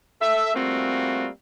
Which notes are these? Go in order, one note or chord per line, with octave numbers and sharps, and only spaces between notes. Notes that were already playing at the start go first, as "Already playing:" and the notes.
A4 E5
G3 A3 A#3 C4 F4 F#4